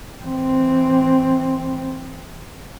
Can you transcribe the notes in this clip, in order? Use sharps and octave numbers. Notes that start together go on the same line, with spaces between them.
E3 C4